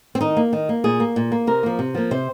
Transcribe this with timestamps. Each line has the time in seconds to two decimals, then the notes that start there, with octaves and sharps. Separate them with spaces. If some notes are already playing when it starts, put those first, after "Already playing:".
0.15 C4
0.21 D#3 D#4
0.37 A#3
0.53 D#3
0.69 A#3
0.84 A#2 G#4
1.00 A#3
1.16 A#2
1.32 A#3
1.47 C3 A#4
1.63 F3 A#3
1.79 C3
1.95 F3 A#3
2.11 C3 C5